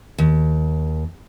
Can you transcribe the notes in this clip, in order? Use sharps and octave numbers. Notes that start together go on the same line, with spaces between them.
D#2